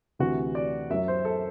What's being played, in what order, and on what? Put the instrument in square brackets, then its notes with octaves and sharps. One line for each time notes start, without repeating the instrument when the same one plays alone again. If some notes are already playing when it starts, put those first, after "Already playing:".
[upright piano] D2 C3 E3 F#4
D5
F#2 F#3 E5
C5
A4